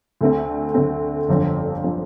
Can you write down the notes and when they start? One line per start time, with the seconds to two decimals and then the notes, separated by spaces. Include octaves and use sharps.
0.21 D2 D3 A3 C4
0.74 D2 D3 A3 C4
1.28 G1 F2 D3 F3 C4
1.84 D3 F3 C4